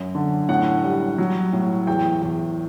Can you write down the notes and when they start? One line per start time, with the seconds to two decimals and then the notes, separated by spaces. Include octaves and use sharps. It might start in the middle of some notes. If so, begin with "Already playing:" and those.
Already playing: F#2
0.15 D3
0.49 A2 F#5
0.83 G3
1.18 F#3
1.53 A2
1.87 E2 G5
2.22 E2